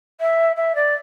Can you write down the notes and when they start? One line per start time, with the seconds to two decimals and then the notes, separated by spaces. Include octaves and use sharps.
0.20 E5
0.56 E5
0.75 D5